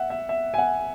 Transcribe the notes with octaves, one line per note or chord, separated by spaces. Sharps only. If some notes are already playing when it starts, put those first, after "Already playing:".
Already playing: E5 F#5
E5
E5
G#5
F#5